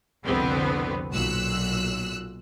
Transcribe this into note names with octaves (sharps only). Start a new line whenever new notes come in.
C2 F2 B2 D3 B3 C4
B1 A#2 E6 F#6